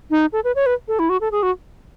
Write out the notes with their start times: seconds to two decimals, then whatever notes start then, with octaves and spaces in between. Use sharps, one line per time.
0.11 D#4
0.33 A4
0.44 B4
0.56 C#5
0.66 B4
0.88 A4
0.99 E4
1.09 F#4
1.21 A4
1.32 G#4
1.43 F#4